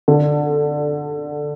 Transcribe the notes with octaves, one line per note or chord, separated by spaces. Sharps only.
D3